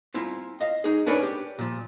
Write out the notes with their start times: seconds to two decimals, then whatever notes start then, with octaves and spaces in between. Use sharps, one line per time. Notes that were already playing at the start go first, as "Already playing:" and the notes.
0.14 C4 E4 F4
0.61 D#5 F5
0.84 D#4 G#4
1.07 C#4 D4 A#4 B4 C#5 D5
1.23 G4
1.59 A#2 F3